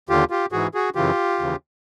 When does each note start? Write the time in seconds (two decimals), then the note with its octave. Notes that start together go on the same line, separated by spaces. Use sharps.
0.09 D#2 D3 F4 G4
0.30 F4 G4
0.52 G#2 E3 F#4 G#4
0.74 F#4 G#4
0.95 F#2 C#3 E3 F4 G4
1.39 D#2 C#3 E3